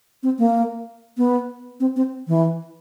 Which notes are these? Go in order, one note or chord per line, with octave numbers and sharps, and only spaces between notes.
C4
A#3
B3
C4
C4
E3